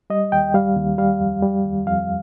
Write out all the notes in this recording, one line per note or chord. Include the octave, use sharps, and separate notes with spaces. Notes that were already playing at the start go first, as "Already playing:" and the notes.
G3 D#5
D#2 G5
G3 F5
D#2
G3 F5
F2
G3
D#2
F2 F5